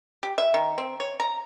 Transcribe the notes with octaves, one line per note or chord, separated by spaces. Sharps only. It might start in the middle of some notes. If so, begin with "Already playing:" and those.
G4
E5
D#3
C4
C#5
A#5